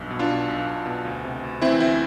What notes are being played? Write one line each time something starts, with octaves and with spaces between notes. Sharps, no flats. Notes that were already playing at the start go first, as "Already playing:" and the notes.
Already playing: B1 G2
B2
D4 F4
B2
B1
B1
B2
D2
C3
D2
E3 C4 E4
D2 C4 E4